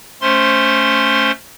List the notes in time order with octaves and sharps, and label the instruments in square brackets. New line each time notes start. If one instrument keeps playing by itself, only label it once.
[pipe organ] A3 C#4 C5 C6